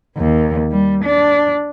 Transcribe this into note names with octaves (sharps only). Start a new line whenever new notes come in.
D#2
G3
D4